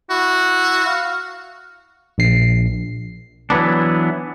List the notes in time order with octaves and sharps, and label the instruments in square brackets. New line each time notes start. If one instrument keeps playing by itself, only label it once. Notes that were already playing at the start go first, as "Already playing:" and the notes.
[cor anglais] E4 [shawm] F#4
[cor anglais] F5
[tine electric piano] A#1 C7
[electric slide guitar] E3 F#3 B3 D4